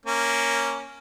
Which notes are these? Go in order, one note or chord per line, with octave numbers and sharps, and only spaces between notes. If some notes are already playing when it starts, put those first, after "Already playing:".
A#3 C#4